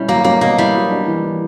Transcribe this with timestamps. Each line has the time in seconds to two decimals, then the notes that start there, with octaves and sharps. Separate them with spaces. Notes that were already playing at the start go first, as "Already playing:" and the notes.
Already playing: B2 G3 C#4 E4
0.08 F#3 A#3
0.24 A#3 C#4
0.41 B2 A#3
0.58 G3 E4
0.75 F#3
0.91 D4
1.07 E3
1.24 E3